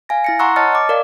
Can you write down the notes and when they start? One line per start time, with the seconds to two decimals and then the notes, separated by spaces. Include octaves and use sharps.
0.09 F5 G#5 A#6
0.24 E4 A#6 C#7
0.39 F#5 A#5 C6 C#6 E6 F#6
0.56 C#5 D#5 A5 F6 A6 C#7
0.73 D#5 D6
0.89 A#4 D5 F5